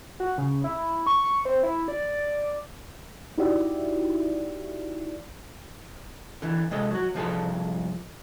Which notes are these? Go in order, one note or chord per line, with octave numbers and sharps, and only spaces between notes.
F#4
C#3
E4
C#6
C4
E4
D5
D#4 E4 F#4 G4 D5 E5
D3 E3
C3 G#3 A4 D#5
F#3 F#4
C2 G2 F3 F4 G#4 A4